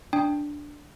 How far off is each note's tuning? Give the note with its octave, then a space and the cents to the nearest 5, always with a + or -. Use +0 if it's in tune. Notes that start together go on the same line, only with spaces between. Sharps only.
D4 +0 G5 +10